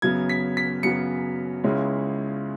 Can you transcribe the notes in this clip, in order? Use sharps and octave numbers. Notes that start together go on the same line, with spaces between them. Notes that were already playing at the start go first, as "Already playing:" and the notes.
F#2 C#3 F#3 B3 G#6
B6
B6
F#2 C#3 F#3 B3 C#7
C#2 C#3 G#3 C#4 E4